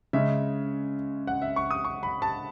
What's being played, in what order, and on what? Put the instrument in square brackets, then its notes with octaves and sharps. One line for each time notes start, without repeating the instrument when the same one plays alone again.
[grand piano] C#3 G#3 C#4 E5
F#5
E5
C#6
D#6
C#6
B5
A5